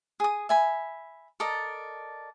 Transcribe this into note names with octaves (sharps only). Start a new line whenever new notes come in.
G#4 D#6
E5 G#5 B5
A4 A#4 D5 D#5